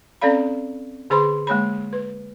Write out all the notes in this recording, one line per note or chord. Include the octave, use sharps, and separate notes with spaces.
C4 C#4 A4 D5 F5 B5
D3 G#4 C5 B5 C6
G#3 A#3 C#5 B5
B4